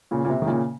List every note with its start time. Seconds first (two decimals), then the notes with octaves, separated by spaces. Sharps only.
0.11 A#2 C#3
0.25 A#2
0.30 C3
0.42 D#3
0.47 A#2 C#3